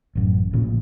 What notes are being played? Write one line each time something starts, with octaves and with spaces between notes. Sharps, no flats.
A1 F#2
A1 A#2 C#3 F3